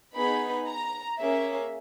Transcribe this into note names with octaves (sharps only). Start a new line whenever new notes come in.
B3 D#4 G#4 B5
A#5
A#3 C#4 G#4 E5